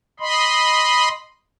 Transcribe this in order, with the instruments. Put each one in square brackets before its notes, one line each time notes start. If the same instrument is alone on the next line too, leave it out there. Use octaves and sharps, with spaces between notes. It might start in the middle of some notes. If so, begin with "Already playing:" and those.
[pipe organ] D#5 B5 C6